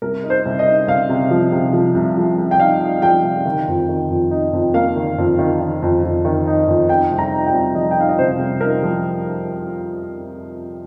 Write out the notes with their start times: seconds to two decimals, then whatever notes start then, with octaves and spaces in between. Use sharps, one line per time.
0.02 C2 A#4
0.23 D#4
0.30 C5
0.46 C2
0.59 D#5
0.66 D#4
0.87 C2 F5
1.09 C3
1.31 F3
1.52 C3
1.73 F3
1.95 C2
2.17 F3
2.38 C2
2.51 G5
2.60 D#4 F5
2.81 D#4
3.02 F3 G5
3.24 C2
3.46 D#3
3.68 F2
3.89 D#3
4.10 F2
4.31 D#4
4.53 F2
4.74 A#3 F5
4.96 D#3
5.18 F2
5.39 D#3
5.61 D#3
5.82 F2
6.03 F2
6.25 D#3
6.47 D#4
6.68 F2
6.89 D#4 G5
7.11 C2
7.18 A#5
7.33 D#4
7.46 G5
7.53 C2
7.75 F3 D#5
7.91 G5
7.97 D#4 F5
8.09 D#5
8.19 C3 C5
8.39 C2
8.61 D#4 A#4
8.82 F3